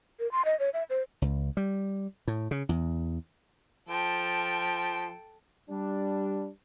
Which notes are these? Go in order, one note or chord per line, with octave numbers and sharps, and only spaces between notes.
A#4
C6
D#5
C#5
E5
C5
C#2
G3
A2
C#3
E2
F3 A4 G5
G3 D4